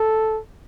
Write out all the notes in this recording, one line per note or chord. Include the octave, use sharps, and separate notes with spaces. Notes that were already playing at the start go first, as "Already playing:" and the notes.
Already playing: A4